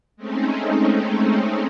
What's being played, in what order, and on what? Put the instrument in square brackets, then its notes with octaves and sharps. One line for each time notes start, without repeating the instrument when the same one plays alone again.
[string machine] G#3 A3 C4 C#4 D#4